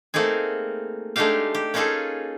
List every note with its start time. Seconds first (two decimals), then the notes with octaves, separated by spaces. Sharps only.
0.14 A3 A#3 C4 D#4 G#4
1.16 G#3 A3 D4 D#4 G4 F5
1.54 G4
1.74 A#3 C#4 D#4 F4 G#4 A4